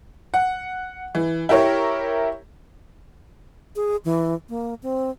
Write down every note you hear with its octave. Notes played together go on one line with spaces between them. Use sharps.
F#5
E3
E4 G4 A#4 C#5
G#4
E3
A#3
C4